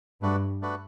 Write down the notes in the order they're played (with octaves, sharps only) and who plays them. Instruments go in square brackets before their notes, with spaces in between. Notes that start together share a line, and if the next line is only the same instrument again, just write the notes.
[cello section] G2 [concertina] A3 D4 F#4 B4
[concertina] A3 D4 F#4 B4